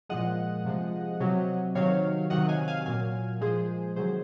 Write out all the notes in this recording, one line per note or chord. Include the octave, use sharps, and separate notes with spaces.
A#2 F3 G#3 D#5 F#5
C3 F3 G#3
C3 F#3
C3 D#3 F#3 C#5 F5
C3 D#3 F#3 D#5 F#5
F5 G#5
F5 G#5
A#2 F#3 F5 G#5
A#2 F3 G#3 G#4 C5
C3 D#3 F#3 G#4 C5